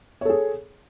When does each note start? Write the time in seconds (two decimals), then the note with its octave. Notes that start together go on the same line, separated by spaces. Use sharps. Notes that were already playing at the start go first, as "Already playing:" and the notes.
0.21 C#5
0.25 A4
0.29 G#4